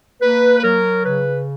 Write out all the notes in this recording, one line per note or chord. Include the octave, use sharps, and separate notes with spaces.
A#3 B4
B4
F#3 A#4
C#3 B4